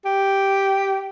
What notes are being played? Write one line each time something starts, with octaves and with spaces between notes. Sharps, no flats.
G4